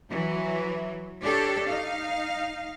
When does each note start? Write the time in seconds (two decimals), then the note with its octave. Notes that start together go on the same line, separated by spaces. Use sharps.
0.10 E3 F#3
1.21 D4 G4 A4 C#5
1.65 D#4 F5